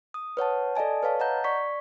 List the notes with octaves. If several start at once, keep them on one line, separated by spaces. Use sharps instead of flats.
D#6
B4 C#5 F#5 A5
A4 D5 D#5 G#5 A5
B4 C#5 F5 A5
D#5 F#5 A#5 G6
D5 C#6 B6